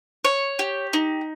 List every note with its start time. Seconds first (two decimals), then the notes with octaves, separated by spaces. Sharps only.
0.25 C#5
0.59 G4
0.93 D#4